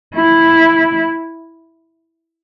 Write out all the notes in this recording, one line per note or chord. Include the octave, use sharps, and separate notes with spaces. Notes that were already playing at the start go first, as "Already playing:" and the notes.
E4